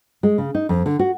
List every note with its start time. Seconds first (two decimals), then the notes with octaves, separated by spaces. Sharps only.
0.23 G#3
0.38 C#3
0.55 D#4
0.69 F2
0.86 D3
0.99 F#4